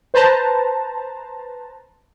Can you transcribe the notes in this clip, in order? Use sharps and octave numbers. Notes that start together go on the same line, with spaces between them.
B4 C5 A5 A#5